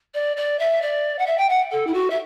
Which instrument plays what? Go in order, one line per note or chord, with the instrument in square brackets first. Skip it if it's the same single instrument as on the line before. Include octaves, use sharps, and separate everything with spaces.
[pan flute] D5
D5
E5
D5
F#5
E5
G5
F#5
A4
E4
F#4
E5